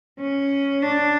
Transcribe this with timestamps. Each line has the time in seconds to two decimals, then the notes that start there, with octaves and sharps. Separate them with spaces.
0.20 C#4
0.82 D4